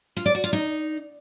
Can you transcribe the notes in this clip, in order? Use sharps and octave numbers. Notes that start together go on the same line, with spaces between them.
F4
D5
F#4
F4
D#4